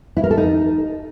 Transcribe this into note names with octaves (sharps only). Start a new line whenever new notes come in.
E4
A#4
A4
D#4